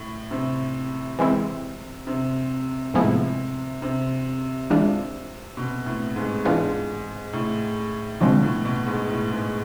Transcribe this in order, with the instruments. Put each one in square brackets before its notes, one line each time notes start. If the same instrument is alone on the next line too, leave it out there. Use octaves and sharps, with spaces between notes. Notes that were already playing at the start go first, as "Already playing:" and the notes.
Already playing: [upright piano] A2
C3
[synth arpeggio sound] E3 G#3 C4 E4
[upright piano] C3
[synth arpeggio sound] A2 F3 G#3 B3 E4 [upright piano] C3
[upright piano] C3
[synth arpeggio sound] E3 G#3 D4 F4
[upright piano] B2
A2
G#2
[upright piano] G#2 [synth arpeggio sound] E3 B3 D4 F4
[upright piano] A2
[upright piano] B2 [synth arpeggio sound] D3 F3 G#3 C4
[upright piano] A2
B2
G#2
A2
G#2